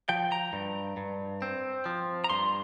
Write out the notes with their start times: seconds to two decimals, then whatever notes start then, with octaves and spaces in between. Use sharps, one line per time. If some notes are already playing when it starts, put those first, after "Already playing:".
0.09 F3 G5
0.32 A#5
0.53 G2
0.97 G2
1.42 C4
1.86 F3
2.24 A#5
2.30 G2 C6